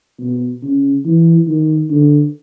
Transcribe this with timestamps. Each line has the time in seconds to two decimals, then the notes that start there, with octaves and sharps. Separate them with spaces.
0.20 B2
0.63 C#3
1.05 E3
1.47 D#3
1.90 D3